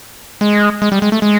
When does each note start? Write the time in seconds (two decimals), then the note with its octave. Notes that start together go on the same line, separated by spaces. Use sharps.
0.41 G#3
0.82 G#3
0.92 G3
1.02 G#3
1.12 A3
1.22 G#3